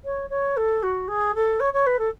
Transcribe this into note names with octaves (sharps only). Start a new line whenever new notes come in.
C#5
C#5
A4
F#4
G#4
A4
C#5
C#5
B4
A4